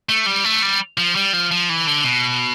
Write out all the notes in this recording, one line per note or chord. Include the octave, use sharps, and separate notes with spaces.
A3
G3
A3
G3
F3
G3
F3
F3
E3
D3
B2